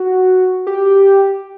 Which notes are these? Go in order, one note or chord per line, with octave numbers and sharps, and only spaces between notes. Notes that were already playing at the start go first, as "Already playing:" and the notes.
Already playing: F#4
G4